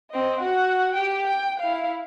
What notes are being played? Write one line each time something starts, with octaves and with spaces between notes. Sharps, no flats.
C4 D#5
F#4 F#5
G4 G5
G5
E4 F5